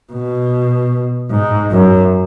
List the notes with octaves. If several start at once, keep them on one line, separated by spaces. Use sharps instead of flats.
B2
G#2
F#2